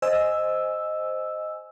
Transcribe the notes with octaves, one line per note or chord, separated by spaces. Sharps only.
C5 D#5 G#5 E6